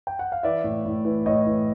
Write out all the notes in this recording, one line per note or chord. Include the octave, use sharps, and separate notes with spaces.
G5
F#5
F5
E3 D5 E5
A2
A2
E3
A2 C#5 D#5
E3